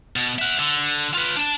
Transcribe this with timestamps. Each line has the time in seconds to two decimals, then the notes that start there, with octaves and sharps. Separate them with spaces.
0.16 B2
0.38 E5 F#5
0.59 D3
1.14 F4 B4
1.36 D4 A5